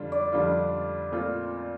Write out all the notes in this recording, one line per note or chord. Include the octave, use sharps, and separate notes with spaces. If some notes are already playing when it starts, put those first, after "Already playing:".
Already playing: F2 D3 G3 D4 F4 C5
D5
F2 D3 G3 D4 F4
A#2 A3 C4 F4